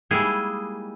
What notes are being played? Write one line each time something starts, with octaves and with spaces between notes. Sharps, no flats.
G3 G#3 A#3 D#4 E4 G#4